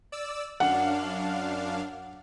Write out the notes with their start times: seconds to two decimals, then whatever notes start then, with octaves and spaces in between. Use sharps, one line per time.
0.12 D5 E6
0.60 F#2 D4 F5 F#5